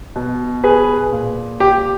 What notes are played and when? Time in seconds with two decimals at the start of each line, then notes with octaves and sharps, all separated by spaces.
0.16 B2
0.64 G#4 B4
1.12 A#2
1.60 G4